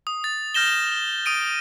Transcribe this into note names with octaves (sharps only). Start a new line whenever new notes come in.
D#6
A6
F6 G6 A#6 E7 G7
D#6 D7 D#7 G7